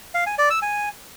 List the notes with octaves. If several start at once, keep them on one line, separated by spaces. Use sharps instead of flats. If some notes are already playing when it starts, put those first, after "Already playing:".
F5
G#5
D5
E6
G#5